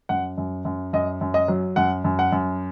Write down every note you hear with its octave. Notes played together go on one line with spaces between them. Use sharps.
F#2 F#5
F#2
F#2
F#2 D#5
F#2
D#5
F#3
F#2 F#5
F#2
F#5
F#2